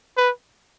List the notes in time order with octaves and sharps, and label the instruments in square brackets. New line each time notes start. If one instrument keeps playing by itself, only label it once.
[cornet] B4